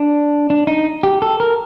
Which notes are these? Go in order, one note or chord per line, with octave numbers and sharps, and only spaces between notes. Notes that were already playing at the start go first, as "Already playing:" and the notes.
Already playing: D4
D4
D#4
G4
A4
A#4